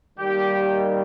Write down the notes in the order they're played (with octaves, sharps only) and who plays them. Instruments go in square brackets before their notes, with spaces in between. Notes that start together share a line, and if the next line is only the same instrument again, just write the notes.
[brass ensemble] D#3 G3 A#3 G4